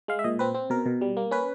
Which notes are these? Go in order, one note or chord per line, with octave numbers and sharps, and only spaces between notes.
G#3 F5
E5
A#2 D#5
C4 B4
C4
B2 A#4
B2
G3
A#3
C#4 B4